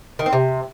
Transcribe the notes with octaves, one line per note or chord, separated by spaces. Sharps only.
D#3
C4
C3